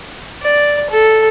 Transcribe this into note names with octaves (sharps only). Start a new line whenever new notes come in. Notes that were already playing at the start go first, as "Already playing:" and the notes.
D5
A4